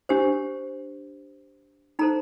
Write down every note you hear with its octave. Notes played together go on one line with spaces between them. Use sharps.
D4 G4 C5
D#4 A4 C5 A#5